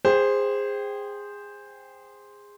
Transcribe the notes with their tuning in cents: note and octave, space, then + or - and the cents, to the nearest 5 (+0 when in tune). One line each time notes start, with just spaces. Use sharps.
G#4 -20 C5 +0 G5 +0